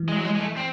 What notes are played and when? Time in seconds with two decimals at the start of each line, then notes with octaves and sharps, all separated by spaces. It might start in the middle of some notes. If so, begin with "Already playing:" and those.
Already playing: E3
0.09 G#3
0.17 F#3
0.25 G#3
0.37 G#3
0.40 A3
0.57 C4